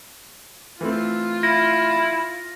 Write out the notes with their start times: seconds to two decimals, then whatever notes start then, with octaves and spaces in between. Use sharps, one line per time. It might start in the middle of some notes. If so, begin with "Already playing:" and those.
0.81 E3 A3 C4 F4
1.43 E4 A#6